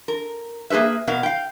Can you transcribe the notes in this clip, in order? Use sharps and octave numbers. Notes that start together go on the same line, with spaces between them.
A#4
A#3 G#4 A4 B4 E5
B2 B3 A#4 F5
F5 G5